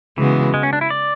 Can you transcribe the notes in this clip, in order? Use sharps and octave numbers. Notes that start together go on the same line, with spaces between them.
C#3 E3 G#3 B3 F#4
G#3
C#4
D4
E4
D5